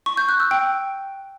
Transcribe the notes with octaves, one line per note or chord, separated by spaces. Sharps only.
C#6
G6
F#6
E6
G5